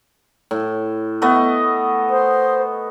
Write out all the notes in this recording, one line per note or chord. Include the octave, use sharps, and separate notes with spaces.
A2
A3 B3 D#5
C5